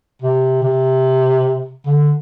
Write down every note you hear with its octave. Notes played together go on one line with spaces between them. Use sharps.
C3
C3
D3